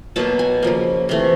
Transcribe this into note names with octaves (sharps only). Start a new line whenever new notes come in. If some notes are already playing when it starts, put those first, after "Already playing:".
B2 F#3 A#3 A5
G#5
C#3 F3 A#3
C3 E3 A3